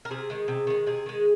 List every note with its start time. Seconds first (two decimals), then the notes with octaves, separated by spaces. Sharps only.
0.05 A#4
0.11 C3 G#4
0.30 D#3 G#3
0.48 C3
0.67 D#3 G#3
0.86 C3 G#4
1.06 D#3 G#3